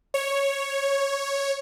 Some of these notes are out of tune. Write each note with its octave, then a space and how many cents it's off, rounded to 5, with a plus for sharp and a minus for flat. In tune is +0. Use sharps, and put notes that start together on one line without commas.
C#5 -5